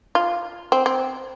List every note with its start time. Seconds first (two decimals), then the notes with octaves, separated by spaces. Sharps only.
0.15 F4
0.72 C4
0.86 C4